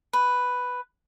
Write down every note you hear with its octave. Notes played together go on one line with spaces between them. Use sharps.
B4